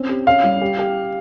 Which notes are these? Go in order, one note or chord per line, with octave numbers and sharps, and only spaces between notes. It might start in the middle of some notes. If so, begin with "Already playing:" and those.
Already playing: C4 C#4
G4
C#4 F5
G3
G4
G4